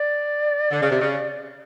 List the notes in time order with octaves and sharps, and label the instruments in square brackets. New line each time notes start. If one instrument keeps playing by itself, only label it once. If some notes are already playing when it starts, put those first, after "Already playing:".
Already playing: [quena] D5
[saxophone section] D3
C#3
C3
C#3